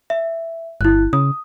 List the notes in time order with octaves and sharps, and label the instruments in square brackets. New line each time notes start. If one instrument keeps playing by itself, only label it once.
[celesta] E5
[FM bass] G1 [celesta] E4 F#6
[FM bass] C#3 [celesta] D#6